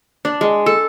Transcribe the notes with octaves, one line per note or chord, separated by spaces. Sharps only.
D4
G#3
A4